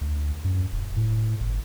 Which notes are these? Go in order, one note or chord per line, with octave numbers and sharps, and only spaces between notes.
D2
F#2
D#1
A2
G1